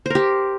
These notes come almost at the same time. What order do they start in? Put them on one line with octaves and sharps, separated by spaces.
C5 A#4 G4